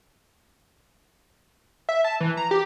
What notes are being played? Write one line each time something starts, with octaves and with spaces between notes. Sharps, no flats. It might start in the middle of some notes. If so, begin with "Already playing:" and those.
E5
A5
E3
A#5
G4